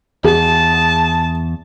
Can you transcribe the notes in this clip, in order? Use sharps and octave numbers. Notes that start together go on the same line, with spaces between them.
E2 G#4 A5